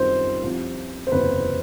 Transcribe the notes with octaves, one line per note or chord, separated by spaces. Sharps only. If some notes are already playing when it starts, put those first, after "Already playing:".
Already playing: F#2 D#3 G3 C4 F4 C5
C2 C3 F3
C5
F#1 E2 C3 B4